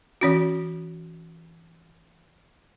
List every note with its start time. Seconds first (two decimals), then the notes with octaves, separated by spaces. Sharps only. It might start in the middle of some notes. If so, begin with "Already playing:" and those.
0.21 E3 C#4 F#4